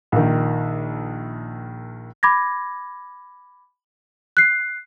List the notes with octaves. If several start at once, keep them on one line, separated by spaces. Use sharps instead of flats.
A#1 D#3
B5 D6 G#6 A#6
F#6 C7